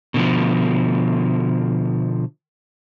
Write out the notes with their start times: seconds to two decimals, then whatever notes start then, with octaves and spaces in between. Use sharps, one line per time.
0.14 B2 D3 D#3 F3